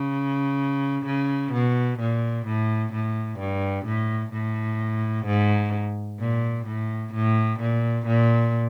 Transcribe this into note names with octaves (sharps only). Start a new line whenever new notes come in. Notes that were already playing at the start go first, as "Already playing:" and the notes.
Already playing: C#3
C#3
B2
A#2
A2
A2
G2
A2
A2
G#2
A#2
A2
A2
A#2
A#2